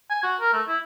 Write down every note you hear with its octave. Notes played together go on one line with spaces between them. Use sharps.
G#5
F#4
A#4
A3
E4